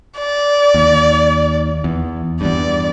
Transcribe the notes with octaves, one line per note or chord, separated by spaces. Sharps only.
D5
D#2
E2
E2 G2 D5